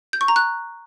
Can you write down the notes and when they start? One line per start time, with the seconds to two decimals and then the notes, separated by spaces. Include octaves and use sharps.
0.13 G6
0.21 C#6
0.28 A#5
0.36 F#6